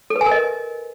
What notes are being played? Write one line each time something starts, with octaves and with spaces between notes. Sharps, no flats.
A4
B4
G#5
A#4
D#5